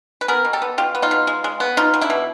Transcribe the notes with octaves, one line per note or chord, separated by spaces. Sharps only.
B4
B3 G#4 A#4
B2
G4 A4
B3
B2 F4 G4
B3
D#4 F4
B2
G#3
G#3
B3
B2 D#4 F4
B2
D4 E4
B2